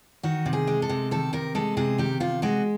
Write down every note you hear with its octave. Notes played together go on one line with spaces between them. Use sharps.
D#3 F#4
C3
G#4
G#3
A4
C3
D#3 A4
C3 A#4
G#3 A4
C3 G#4
D#3 G4
C3 F4
G#3 F#4